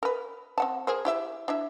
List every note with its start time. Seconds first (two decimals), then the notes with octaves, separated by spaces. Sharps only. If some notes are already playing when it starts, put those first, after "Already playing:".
0.03 A#4 B4
0.58 C4 F#5 A5
0.87 G#4 A#4 C5
1.05 E4 G4 E5
1.48 D4 E4 E5